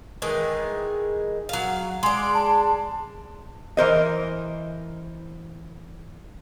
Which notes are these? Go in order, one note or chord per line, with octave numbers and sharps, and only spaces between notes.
D#3 E3 G#3
F#3 F5
G#3 D5 C6
A5
E3 A#4 C5 D#5